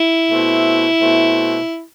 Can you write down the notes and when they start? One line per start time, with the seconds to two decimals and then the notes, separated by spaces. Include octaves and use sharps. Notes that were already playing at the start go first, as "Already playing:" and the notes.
Already playing: E4
0.29 B2 A3 C4
1.00 B2 A3 C4